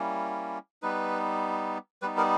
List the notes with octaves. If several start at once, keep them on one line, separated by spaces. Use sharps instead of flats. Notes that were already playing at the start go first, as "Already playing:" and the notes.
Already playing: G3 A#3 C#4 E4
G3 B3 D#4 B4
G3 B3 D#4 B4
A#4